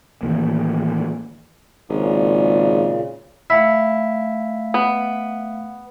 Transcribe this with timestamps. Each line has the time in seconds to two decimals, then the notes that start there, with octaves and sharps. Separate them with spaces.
0.23 A2 D#3 E3 A#3
1.89 G#1 A#2 C#3
3.50 A3 E4 F5 F#5
4.74 B3